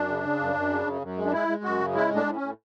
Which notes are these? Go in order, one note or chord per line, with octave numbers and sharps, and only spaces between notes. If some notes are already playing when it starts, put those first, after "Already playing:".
Already playing: F#2 D4
C#3
C#3
F#2
F#2
C#3
F#2
F#2
G#3
D4
G#3 E4
G#3
F#2 F#4
C#3
G#3 E4
A2
D4
A2
C#4
A2